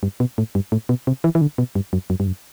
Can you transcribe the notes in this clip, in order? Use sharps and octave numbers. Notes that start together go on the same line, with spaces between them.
G2
B2
A2
G2
A2
B2
C3
E3
E3
D3
B2
G2
F#2
F#2
G2
F#2